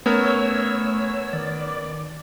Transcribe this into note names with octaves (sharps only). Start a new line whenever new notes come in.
A3 B3 C#4 A#4 C#5 E6
D#3 D5